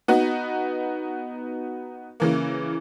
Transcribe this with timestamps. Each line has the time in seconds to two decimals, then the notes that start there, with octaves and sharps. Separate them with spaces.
0.08 B3 D#4 F#4
2.20 C#3 E3 A#3